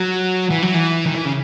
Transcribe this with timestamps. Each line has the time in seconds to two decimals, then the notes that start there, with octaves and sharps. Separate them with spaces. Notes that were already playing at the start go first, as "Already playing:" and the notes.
Already playing: F#3
0.51 E3
0.62 F#3
0.74 E3
1.06 D#3
1.15 E3
1.25 C#3